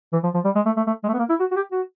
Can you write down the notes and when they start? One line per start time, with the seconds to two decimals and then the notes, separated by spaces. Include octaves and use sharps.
0.13 E3
0.23 F3
0.34 F3
0.45 G3
0.55 G#3
0.66 A3
0.77 A3
0.87 A3
1.04 G#3
1.08 A3
1.14 B3
1.19 A#3
1.29 E4
1.40 F#4
1.51 F#4
1.56 G4
1.72 F#4